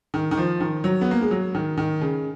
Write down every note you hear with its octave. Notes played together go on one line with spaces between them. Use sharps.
D#3
D#3
F3
D#3
F#3
B3
A#3
G#3
F#3
D#3
D#3
C#3